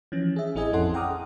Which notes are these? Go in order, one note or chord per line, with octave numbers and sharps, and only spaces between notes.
E3 F3 C#4
G#4 E5
A1 C4 E4 G#4 D#5 G#5
F2 C#4 E4 A4 F#5 C6
F#5 G5 A#5 D6 D#6 F6